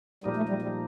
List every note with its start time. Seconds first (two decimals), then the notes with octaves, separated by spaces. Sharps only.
0.24 A#2 F3 G3 A#3 D#4
0.37 A3
0.49 G3
0.62 G3